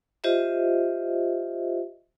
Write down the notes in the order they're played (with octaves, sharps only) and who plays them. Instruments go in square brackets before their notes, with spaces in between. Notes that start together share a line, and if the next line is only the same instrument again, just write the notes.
[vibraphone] F4 G4 C5 D#5 E5